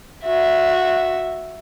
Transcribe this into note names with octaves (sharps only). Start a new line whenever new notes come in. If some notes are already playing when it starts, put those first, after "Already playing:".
F#4 E5